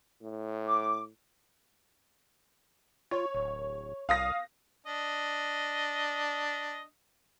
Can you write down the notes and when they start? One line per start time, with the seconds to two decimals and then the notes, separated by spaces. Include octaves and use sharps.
0.22 A2
0.68 D6
3.11 F4 C#5
3.35 D1
4.09 C2 F5 D#6 A#6
4.87 D4 D#5